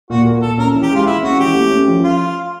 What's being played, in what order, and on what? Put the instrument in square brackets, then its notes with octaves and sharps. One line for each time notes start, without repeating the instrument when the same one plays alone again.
[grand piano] A#2 [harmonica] F#4
[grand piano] A#3
[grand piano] A#2 [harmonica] A4
[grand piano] C#4 [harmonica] A#4
[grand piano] E3
[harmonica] G4
[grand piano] G#3 [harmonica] F4
[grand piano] E3 [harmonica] E4
[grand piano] C#4 [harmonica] F#4
[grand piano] E3 [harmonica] G4
[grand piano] A3
C#4
F3
[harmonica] F4